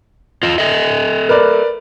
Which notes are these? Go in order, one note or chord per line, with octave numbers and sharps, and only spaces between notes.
F4 D#5
A4 D#5 E5
A#4 B4 D5